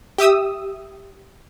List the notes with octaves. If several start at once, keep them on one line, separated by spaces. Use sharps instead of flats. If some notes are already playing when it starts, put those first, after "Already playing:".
G4 E5 D#6 E6